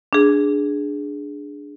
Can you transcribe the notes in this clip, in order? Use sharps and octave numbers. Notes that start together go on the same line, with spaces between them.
D4 G#4